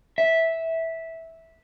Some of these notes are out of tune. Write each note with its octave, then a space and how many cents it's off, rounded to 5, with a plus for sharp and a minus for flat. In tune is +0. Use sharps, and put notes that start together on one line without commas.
E5 -10